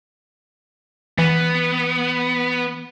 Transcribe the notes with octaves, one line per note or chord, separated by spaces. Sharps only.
E3 B3